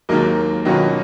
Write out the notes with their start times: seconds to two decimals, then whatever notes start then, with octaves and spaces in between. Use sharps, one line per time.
0.09 D#2 D#3 F#3 G#3 A#3 D#4 A#4
0.65 B2 D#3 F#3 A#3 C#4 F4 B4